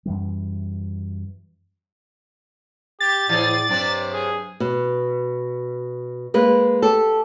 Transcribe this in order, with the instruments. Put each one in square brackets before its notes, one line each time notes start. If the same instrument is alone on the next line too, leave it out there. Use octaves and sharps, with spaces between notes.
[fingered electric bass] F#2 E3 G3
[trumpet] G4 [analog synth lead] A6
[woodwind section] A2 [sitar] E3 G#4 [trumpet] D5
[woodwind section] G2 F#3 [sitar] C3 C4 D4
[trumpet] G#4
[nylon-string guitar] B2
G#3 A#3 B4
G4 A4